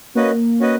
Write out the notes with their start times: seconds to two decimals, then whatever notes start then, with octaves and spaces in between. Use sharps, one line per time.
0.15 A#3 C#4 F#4 B4 D#5
0.60 C#4 F#4 B4 D#5